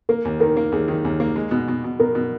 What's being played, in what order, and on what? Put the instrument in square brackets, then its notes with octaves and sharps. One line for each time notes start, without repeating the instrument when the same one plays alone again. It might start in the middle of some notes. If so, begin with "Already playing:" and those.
[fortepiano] A#3 [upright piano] A#4
[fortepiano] D#2
[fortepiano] D#3 [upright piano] A#4
[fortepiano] A#3
[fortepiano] D#2 [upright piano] G#4
[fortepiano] D#3
D#2
A#3
G#3
B2
B2
B2
[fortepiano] B2 [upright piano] A#4
[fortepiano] B2